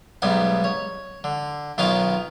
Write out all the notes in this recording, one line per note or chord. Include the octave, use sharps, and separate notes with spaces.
B1 G#2 G3 B3 G#5
C#5
D3
B1 D#3 B3 F4 C#5 F5